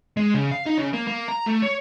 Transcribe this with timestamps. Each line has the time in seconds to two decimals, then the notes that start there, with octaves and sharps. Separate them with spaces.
0.17 G#3
0.34 C#3
0.52 F5
0.66 D#4
0.78 C#3
0.94 A#3
1.08 A#3
1.29 A#5
1.47 A3
1.63 C#5